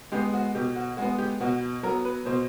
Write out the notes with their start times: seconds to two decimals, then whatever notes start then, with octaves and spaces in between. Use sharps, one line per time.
0.12 G#3 B3 G4
0.34 F#4
0.55 B2 G4
0.76 F#4
0.97 G#3 B3 F#4
1.19 G4
1.41 B2 F#4
1.83 F#3 A#4
1.86 B3
2.05 B4
2.25 B2 C5